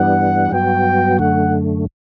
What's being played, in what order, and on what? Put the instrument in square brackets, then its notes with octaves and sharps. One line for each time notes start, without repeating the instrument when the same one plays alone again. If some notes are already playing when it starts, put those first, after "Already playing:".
Already playing: [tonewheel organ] G2 E3 G3 B3 D4 [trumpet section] F#5
[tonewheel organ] G2 F#3 B3 F#4 [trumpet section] G5
[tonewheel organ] F#2 D3 A3 [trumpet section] F#5